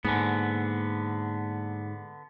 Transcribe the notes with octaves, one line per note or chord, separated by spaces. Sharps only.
G#2 D3 A#3 B3 G#5